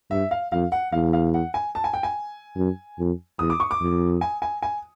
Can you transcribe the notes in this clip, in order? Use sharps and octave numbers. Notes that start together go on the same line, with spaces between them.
G2 E5
F5
F2 F5
F#5
E2 F5
F5
F#5
G#5
A5
G#5
G5
G#5
F#2
F2
E2 D#6
D6
C#6
D6
F2
G#5
G#5
G#5